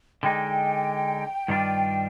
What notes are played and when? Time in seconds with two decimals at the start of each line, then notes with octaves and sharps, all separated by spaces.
0.23 D3 G#3 D#4 G5
1.48 G2 D#3 G3 D4 F4